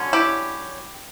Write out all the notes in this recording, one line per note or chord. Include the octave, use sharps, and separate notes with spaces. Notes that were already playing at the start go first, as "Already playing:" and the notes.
Already playing: D3 F#3 C#4
E4 G4